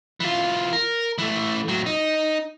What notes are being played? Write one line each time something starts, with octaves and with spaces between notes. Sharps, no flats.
E3 F4
A#4
E3 A3
A2 F#3
D#4